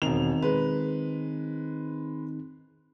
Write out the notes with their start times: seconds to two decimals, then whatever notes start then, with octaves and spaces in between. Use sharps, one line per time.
0.02 E1 D#3 C4 D#4 F7
0.42 G#3 B4